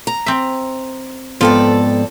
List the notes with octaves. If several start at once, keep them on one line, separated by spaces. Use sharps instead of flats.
A#5
C4 E5
F2 G#2 B3 F4 A4 D5 G5